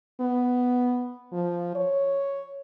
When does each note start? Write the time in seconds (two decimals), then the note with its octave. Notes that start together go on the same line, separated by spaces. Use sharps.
0.20 B3
1.32 F3
1.75 C#5